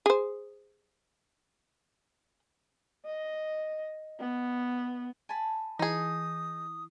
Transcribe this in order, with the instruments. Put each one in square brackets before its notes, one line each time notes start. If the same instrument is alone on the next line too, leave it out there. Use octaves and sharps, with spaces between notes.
[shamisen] G#4 C5
[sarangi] D#5
B3
[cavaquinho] G#5 A5 B5
[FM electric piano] E3 [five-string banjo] D#4 G#4 [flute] D#6